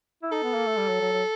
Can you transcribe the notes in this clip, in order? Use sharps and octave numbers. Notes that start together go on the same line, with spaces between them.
E4
D#4 A4
B3
A#3
A3
G3
F#3
F#3
F#3